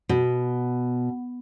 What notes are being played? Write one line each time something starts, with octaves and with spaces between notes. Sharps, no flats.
B2